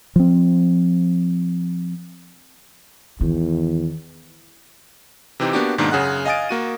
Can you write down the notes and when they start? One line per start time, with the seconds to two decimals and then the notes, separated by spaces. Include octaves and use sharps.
0.16 F3 C4
3.21 E2 D#3
5.40 C3 E3 C4 D#4 G4
5.53 A#3 B3 D4 F#4 G4
5.78 G#2 B2 D#3 A#3 D4 D#4
5.91 F#2 C#3 G#4 F#5 F#6
6.26 D#5 F5 G#5 D#6 A6 D7
6.49 A#3 F#4 D#7